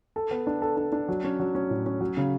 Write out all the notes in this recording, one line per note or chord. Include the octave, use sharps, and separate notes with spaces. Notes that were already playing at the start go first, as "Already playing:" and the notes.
A4
B3
D4
A4
D4
D4
F#3
C#4
F#3
C#4
A2
C#4
F#3
C#3